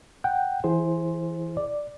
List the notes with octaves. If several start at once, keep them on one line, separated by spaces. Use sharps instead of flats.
F#5 G5
E3 E4 G#4 C5
D5